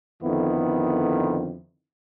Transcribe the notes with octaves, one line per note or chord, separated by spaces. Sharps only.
F2 D3 D#3 B3 E4